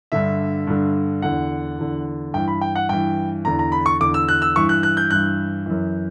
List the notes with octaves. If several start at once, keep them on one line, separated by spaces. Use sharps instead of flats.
G2 D3 E5
G2 D3
E2 D3 F#5
E2 D3
G2 E3 G5
B5
G5
F#5
G2 E3 G5
E2 D3 A#5
A#5
B5
C#6
E2 D3 D6
E6
F#6
E6
G2 E3 C#6
F#6
F#6
G6
G2 E3 F#6
F#2 E3